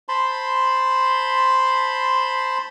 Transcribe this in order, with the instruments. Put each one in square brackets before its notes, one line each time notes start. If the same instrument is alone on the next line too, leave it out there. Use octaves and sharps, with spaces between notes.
[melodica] C5 A5 B5 C6